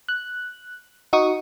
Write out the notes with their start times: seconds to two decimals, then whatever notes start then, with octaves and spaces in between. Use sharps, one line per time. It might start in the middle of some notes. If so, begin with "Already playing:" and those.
0.09 F#6
1.13 D#4 F#4 C#6 D#6